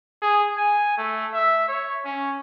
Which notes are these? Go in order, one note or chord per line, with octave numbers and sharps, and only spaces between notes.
G#4
G#5
A3
E5
C#5
C#4